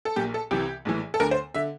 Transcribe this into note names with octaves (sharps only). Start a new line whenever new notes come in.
A4
A#1 A#2 G4
A4
C2 C3 E3 G4
A#1 A2 E3
A4
D2 D3 A#4
C5
D3 E5